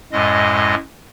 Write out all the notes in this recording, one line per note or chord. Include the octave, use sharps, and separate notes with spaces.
F#2 A2 G#3 D#5